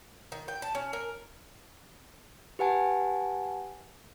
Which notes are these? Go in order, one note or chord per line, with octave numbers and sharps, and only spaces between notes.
D#3
G5
A5
C#4
A#4
G4 B4 F#5 G#5 A5